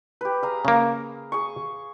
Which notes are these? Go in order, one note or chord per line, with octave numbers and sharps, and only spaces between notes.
G4 B4
G#4 F5 A#5
C#3 A#3
G#4 C#6